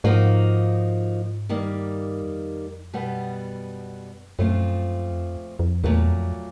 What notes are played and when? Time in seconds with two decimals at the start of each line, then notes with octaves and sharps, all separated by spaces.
0.04 G#2 F3 A#3 D#4 F#4
1.49 G2 D#3 G3 A#3
2.22 F2
2.93 F#2 B2 G3 B3
4.39 F#2 A#2 F3 A3 C4 F4
5.12 F2
5.59 F2
5.83 E2 A#2 F#3 A3
6.08 F2